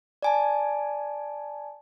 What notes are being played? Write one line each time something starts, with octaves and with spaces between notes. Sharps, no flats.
D5 G#5 A5